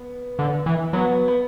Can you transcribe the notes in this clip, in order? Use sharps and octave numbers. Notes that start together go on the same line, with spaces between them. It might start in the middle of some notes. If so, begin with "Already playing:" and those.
Already playing: B3
D3
E3
F#3 B3
B3